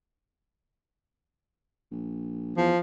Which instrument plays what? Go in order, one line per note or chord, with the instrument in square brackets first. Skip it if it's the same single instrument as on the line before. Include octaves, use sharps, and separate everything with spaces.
[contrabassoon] A#1
[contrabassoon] E2 [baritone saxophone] F3